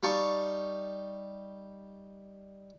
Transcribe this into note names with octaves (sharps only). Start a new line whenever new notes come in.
G3 D#4 F5 A5 C#6